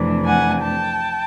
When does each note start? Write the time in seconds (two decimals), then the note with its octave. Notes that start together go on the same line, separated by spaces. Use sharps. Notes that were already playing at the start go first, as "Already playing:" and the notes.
Already playing: F2 C3 E3 A3 D4
0.26 F#5 G#5
0.62 G5 A5